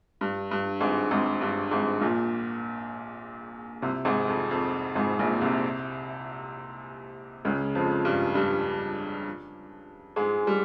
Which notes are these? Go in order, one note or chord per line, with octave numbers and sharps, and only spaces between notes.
G2
G2
G#1 G#2
G#1 G#2
G2
G#1 G#2
A#1 A#2
C2 C3
G#1 G#2
F2
F2
G#1 G#2
A#1 A#2
C2 C3
C#2 C#3
F2 F3
G2 G3
G2 G3
G#2 G#3
G3